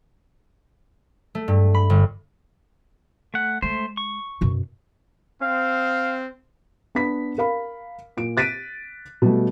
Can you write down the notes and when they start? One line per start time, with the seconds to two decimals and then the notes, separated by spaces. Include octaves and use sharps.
1.35 A3
1.48 G2
1.75 B5
1.90 G1
3.34 A3 F#5
3.62 G#3 A3 C5
3.97 C#6
4.41 F#2 B2
5.42 C4 F5
6.95 B3 D4 B5 B6
7.38 A#4 F5 B5
8.17 A#2 D7
8.37 F#6 A6 B6 D7 D#7
9.22 B2 G3 A3